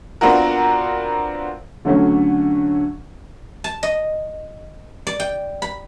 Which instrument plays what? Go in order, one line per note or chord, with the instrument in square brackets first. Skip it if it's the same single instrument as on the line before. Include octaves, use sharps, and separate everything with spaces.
[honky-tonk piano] B3 C4 D4 F4 F#4 A#4
[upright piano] D3 F#3 A3 C#4
[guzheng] A5
D#5
D5
G5
B5